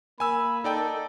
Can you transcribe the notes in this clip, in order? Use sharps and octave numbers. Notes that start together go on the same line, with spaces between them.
A#3 G#5 B5 E6
D#4 A4 D5 G5